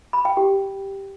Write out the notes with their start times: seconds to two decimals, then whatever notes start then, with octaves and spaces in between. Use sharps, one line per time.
0.13 B5
0.25 G5
0.37 G4